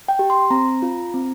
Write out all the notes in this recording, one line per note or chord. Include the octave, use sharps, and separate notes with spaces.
G5
G4
C6
C4 A#5
F4
C4